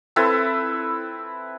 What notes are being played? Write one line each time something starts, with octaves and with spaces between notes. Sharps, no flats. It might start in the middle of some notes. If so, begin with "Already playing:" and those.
C4 E4 A4 B4